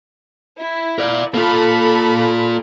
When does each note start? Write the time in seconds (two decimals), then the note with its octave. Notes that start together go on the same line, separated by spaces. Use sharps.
0.60 E4
0.98 A#4 D5
1.34 A#3 F4 A4 B5